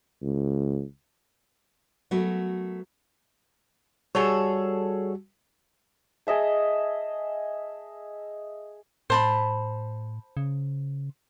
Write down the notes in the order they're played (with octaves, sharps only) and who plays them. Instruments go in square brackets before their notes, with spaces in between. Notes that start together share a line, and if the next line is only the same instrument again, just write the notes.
[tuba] C#2
[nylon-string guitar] F#3 A3 B3 F#4 A#4 B4
[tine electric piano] G3 F#4 [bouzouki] G#4 A4 C#5
[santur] G#4 D#5 E5 A5
[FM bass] A2 [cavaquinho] C5 A5 B5
[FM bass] C#3